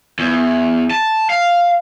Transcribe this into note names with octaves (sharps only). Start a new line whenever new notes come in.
E2
A5
F5